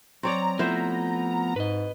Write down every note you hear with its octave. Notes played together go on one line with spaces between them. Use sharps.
F#3 C4 C#5 D5 A#5
F3 A3 B3 E4 C5 E5
G#2 B4 D#5